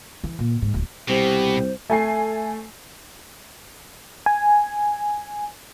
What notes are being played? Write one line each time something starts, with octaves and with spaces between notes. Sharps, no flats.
E3
A#2
G#2
D1
C2 B2 G4 C5
A3 G#5 C7
G#5